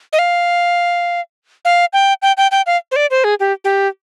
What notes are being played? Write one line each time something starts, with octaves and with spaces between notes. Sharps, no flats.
D#5
F5
F5
G5
G5
G5
G5
F5
C5
D5
C5
G#4
G4
G4